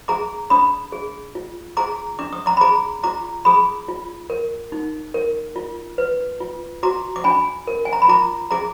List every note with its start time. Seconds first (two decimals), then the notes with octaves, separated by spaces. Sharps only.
0.08 G#4 A#5 D6
0.50 D4 B5 D#6
0.92 G#4
1.35 F4
1.77 G#4 A#5 D6
2.19 D4 D6
2.33 D#6
2.46 A#5 D6
2.57 B5
2.61 G#4 A#5 D6
3.03 F4 A#5 D6
3.45 G#4 B5 D#6
3.88 F4
4.30 A#4
4.72 D#4
5.14 A#4
5.56 F4
5.98 B4
6.40 F4
6.83 F#4 A#5 D6
7.16 D6
7.24 D4 G#5 B5
7.67 A#4
7.85 G#5
7.93 A#5
8.02 B5
8.08 F4 A#5 D6
8.51 G#4 A#5 D6